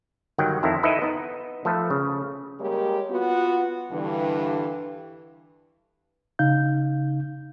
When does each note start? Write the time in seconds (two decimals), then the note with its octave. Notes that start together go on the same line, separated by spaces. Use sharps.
0.38 G1 D#3 F#3 F#5 G5
0.63 F2 D#3 E4 A4 C5 A#5
0.83 D#4 E4 A4 B4 D#5 E5
1.02 B3 D#4
1.65 F3 A3 A4 B4
1.90 C#3
2.60 G3 G#3 A#3 G4 A#4 C#5
3.10 B3 F4 F#4
3.91 G2 D3 E3
6.39 C#3 D#4 F5 G6